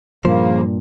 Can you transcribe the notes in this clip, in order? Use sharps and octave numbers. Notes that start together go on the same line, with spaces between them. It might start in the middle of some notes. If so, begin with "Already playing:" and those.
G2 A#2 C#3 F3 A#3 C5